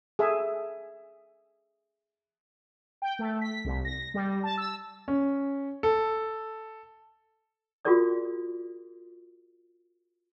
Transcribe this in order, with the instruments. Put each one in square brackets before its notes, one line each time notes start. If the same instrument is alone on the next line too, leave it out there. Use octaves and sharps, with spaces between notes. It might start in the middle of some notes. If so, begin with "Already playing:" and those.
[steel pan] G#4 A4 E5
[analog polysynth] G5
A3
B6
C2
A#6
G3
A5
E6
[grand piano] C#4
A4
[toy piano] F4 F#4 G#4 A#4 D5 D#6